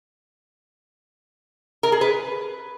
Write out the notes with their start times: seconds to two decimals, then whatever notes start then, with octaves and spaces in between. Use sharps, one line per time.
1.83 A#4
1.92 G#4
2.01 B4